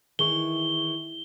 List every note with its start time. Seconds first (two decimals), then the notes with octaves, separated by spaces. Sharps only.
0.19 D#3 E3 G#4 C#6 G7